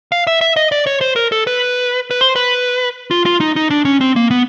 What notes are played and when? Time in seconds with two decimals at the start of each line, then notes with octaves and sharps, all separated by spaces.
0.12 F5
0.27 E5
0.41 E5
0.56 D#5
0.72 D5
0.87 C#5
1.01 C5
1.16 A#4
1.32 A4
1.47 B4
2.11 B4
2.21 C5
2.36 B4
3.11 F4
3.26 F4
3.40 D#4
3.56 D#4
3.70 D4
3.85 C#4
4.01 C4
4.16 A#3
4.31 B3